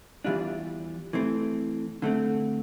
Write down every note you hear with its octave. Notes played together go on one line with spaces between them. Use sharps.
E2 E3 G3 D4 F4
E3 A3 C4
D3 A3 C4